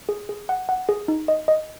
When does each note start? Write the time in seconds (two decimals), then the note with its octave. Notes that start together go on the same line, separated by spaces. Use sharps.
0.09 G#4
0.29 G#4
0.49 F#5
0.69 F#5
0.89 G#4
1.08 D#4
1.28 D#5
1.48 D#5